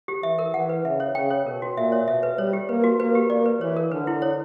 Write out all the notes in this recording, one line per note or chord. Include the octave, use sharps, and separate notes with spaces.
G4
E3 E5
A#4
E3 F#5
B4
C#3 E5
C#5
C#3 G5
C#5
B2 A#4
F#4
A#2 E5
C#5
B2 E5
B4
G3 C#5
G4
A#3 B4
F#4
A#3 B4
G4
A#3 D5
B4
E3 C#5
A#4
D3 B4
E4
C#5